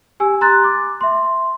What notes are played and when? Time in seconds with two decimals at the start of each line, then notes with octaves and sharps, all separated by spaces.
0.20 G4 G#5 E6
0.41 A#5 C6 F#6 A6
0.64 D6
1.01 E5 C6